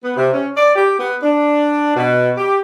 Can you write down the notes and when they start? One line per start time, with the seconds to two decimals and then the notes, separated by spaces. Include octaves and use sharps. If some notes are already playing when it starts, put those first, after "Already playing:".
0.04 B3
0.17 C3
0.32 C#4
0.57 D5
0.76 G4
0.99 B3
1.23 D4
1.96 B2
2.37 G4